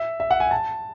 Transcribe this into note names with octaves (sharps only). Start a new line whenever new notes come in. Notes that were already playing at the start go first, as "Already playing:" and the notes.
Already playing: E5
E5
F#5
G#5
A5